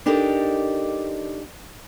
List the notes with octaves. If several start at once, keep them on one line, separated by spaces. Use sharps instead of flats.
D4 D#4 G4 A4 A#4